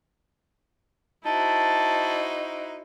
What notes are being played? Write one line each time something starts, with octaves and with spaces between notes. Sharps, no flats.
D#4 E4 F#4 C5 A5